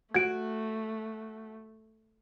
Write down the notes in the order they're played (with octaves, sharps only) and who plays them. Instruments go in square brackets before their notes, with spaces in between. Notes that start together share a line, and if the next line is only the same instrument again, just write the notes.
[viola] A3 [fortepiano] F#4 [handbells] G#6 D7